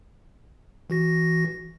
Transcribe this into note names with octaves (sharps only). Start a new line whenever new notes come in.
E3 F#4 A#6